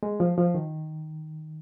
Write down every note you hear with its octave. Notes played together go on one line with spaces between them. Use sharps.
G#3
F3
F3
D#3